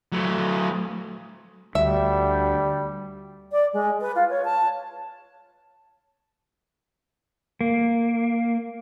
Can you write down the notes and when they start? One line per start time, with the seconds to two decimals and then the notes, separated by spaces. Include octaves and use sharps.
0.12 F#3 A3
1.75 D2 G3 E5
3.52 D5
3.73 G#3
4.01 B4
4.15 F4
4.29 C#5
4.45 A5
7.61 A#3